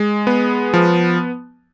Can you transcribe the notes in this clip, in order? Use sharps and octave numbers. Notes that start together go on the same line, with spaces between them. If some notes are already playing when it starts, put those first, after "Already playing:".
Already playing: G#3
B3
F3